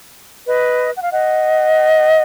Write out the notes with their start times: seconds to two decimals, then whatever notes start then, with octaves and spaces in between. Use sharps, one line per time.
0.45 B4 D#5
0.96 F#5
1.04 F5
1.11 D#5 F#5